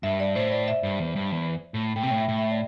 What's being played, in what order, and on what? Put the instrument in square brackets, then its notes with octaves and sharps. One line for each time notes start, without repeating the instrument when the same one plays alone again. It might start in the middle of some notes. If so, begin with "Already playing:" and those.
[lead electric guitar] G2 [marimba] E5
[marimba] D5
[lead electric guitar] A2 [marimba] C5
[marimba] D5
E5
[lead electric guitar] G2
E2
G2
E2
A2
[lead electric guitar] A2 [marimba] G5
[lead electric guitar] C3
[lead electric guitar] A2 [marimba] G5
[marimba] E5
[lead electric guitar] A2
[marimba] E5
D5